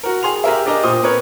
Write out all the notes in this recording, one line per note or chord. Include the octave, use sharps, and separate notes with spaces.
F#4 A#4
G#4 C6 F7
G4 G#4 A#4 E5
D4 G4 A#4 D#5
A#2 C5 D#6
C4 A#4 B4 C#5